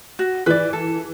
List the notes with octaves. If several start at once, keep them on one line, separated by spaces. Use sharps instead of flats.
F#4
E3 B4 D5
A4